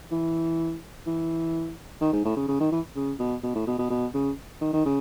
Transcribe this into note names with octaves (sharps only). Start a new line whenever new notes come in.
E3
E3
D#3
G#2
A2
C#3
C#3
D#3
E3
C#3
B2
B2
A2
B2
B2
B2
C#3
D#3
D#3
C#3